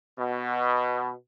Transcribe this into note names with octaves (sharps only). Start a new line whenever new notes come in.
B2